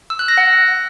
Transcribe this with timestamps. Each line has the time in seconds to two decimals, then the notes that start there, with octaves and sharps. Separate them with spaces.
0.10 E6
0.19 F#6
0.28 A#6
0.37 F#5